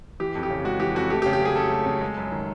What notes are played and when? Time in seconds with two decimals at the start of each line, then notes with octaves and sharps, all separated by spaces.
0.20 E3 G4
0.35 F2
0.43 G4
0.50 C#3
0.64 G#3 F#4
0.80 E3 G4
0.95 F2 F#4
1.10 A3 G4
1.22 G4
1.26 C#3
1.33 G4
1.41 F#3 G#4
1.56 C#4 A4
1.71 A3
1.86 C#3
2.01 G#3
2.17 F#2
2.32 D#3